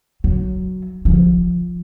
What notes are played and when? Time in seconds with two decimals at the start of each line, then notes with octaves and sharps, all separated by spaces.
0.24 F#3
1.05 F3